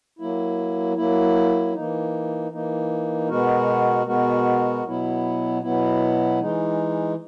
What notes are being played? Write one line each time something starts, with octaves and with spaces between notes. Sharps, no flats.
F#3 A#3 E4
F#3 A#3 E4
E3 A#3 D#4
E3 A#3 D#4
B2 G#3 B3 F#4 A#4
B2 G#3 B3 F#4 A#4
B2 F#3 B3 E4
B2 F#3 B3 E4
E3 G#3 D#4